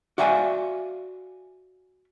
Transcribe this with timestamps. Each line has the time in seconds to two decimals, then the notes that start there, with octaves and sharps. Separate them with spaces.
0.18 F#4 D5 E5 F5 G5 G#5